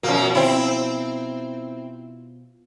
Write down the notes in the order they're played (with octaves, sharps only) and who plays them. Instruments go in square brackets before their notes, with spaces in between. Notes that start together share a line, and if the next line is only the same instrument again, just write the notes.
[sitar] F#2 A#3 [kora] B2 F3
[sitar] C4 E4